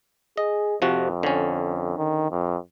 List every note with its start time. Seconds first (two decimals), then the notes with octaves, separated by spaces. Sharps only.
0.37 G#4 D#5
0.82 F2 C3 F3 F#4
1.23 D3 C#4
1.97 D#3
2.31 F2